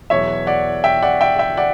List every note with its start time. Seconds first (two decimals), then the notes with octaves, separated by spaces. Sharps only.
0.10 E2 B2 F#3 C#5 E5
0.47 D5 F#5
0.84 E5 G5
1.02 D5 F#5
1.21 E5 G5
1.39 E5 G5
1.57 D5 F#5